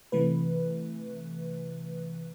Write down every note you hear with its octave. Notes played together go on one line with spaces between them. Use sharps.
C3 E3 A3 B4